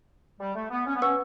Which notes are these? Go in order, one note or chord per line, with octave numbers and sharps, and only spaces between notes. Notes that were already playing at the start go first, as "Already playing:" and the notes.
G3
A3
B3
C#4
B3
C#4 B4 F#5 C#6 E6